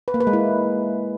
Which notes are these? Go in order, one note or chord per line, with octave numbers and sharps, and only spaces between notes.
B4
A#3
B4
G#3
E4